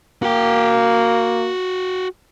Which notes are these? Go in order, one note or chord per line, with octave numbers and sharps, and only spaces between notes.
A#3 F#4 G5